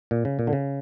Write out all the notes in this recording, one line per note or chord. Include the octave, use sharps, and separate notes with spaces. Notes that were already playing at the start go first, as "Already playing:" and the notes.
A#2
C#3
A#2
D3
C#3